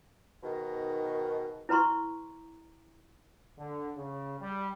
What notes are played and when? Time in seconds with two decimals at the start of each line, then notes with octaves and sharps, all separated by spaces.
0.43 G#2 B2 D#3
1.69 E4 B4 A#5 C6 C#6
3.58 D3
3.96 C#3
4.41 G3